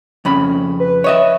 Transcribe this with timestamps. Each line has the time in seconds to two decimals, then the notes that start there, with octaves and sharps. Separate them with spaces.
0.25 F2 C#3 B5
0.80 B4
1.04 C#5 D#5 E5